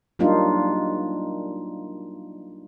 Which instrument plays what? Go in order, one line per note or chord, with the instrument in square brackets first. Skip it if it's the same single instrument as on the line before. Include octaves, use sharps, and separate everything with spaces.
[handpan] F#3 G3 A#3 D4 D#4 F4